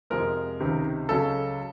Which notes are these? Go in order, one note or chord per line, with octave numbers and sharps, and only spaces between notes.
F2 C3 F3 G#3 A#4
C#2 C3 D#3
C#2 C#3 F#3 A4